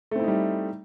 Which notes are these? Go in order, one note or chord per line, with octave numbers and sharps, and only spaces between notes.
G3 A3 C4 D#4 E4